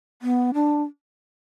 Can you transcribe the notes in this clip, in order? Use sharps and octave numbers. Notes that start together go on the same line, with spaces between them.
B3
D4